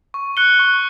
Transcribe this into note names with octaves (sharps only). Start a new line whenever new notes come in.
C#6
F#6 C#7 G7
C#6